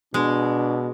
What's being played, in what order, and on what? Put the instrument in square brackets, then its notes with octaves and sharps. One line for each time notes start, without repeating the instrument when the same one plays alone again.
[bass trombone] B2 [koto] G#3 [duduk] D4